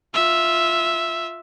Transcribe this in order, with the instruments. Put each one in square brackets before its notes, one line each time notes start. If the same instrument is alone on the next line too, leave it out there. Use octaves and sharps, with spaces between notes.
[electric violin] F4 E5